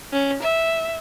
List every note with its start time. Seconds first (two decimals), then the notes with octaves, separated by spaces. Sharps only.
0.13 C#4
0.42 E5